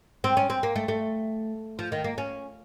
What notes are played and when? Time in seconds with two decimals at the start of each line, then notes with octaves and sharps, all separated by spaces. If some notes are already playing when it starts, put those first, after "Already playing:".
0.24 C4
0.37 C#4
0.50 C4
0.63 A#3
0.76 A3
0.88 A3
1.79 F3
1.92 D#3
2.04 A#3
2.18 C#4